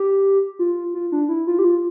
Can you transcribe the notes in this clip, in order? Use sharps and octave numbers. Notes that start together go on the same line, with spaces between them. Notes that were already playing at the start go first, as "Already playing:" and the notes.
Already playing: G4
F4
F4
D4
E4
F4
G4
F4